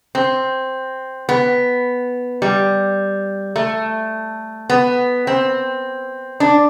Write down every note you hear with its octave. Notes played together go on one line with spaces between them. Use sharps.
C4
B3
G3
A3
B3
C4
D4